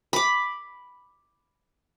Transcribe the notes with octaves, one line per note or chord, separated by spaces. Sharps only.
B5 D6